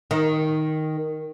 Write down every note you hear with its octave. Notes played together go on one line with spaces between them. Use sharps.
D#3